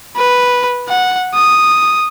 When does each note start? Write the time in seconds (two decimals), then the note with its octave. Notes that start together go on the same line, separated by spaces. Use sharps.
0.17 B4
0.88 F#5
1.34 D#6